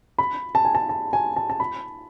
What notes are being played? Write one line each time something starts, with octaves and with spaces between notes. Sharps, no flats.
B5
A5
G#5
A5
A5
G#5
A5
A5
B5